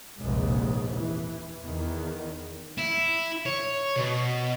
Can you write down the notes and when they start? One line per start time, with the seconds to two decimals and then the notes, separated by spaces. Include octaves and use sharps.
0.22 F1 A#1 D#2 G#2
0.97 E3
1.63 E2 D#3
2.78 E4
3.46 C#5
3.96 B2